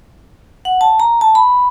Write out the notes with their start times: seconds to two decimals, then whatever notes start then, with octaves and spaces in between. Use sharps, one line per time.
0.65 F#5
0.81 A5
1.00 A#5
1.21 A5
1.35 B5